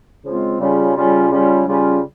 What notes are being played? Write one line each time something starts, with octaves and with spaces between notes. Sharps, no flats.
C#3 F3 G#3 C4 F4
C#3 G3 C#4 F4
C#3 G3 C#4 F4
C#3 G3 C#4 F4
C#3 G3 C#4 F4